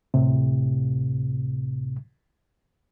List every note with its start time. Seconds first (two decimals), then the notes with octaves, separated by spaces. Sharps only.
0.14 D2 A2 C3